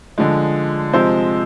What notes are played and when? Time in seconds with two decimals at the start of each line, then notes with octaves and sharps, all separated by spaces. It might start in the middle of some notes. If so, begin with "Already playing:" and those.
0.18 D3 F3 G#3
0.93 C3 F3 G#3 C5